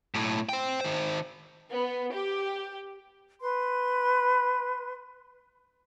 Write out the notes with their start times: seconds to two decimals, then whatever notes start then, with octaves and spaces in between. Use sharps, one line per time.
0.14 B1 A2
0.49 C5 G5
0.81 D#3 C5
1.72 B3
2.13 G4
3.41 B4 C6